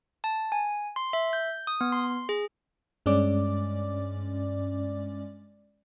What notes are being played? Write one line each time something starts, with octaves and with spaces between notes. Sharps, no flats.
A5
G#5
C6
E5
G6
D#6
B3
C6
G#4
G2 G#3 C#4 D5 D6